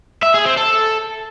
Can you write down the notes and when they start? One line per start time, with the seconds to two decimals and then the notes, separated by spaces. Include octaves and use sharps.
0.23 E5
0.34 G#4
0.46 C4
0.57 A4